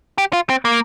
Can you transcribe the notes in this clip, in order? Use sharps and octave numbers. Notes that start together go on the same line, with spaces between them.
G4
F4
C4
A#3